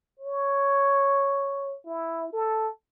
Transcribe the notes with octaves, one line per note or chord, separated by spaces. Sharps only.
C#5
E4
A4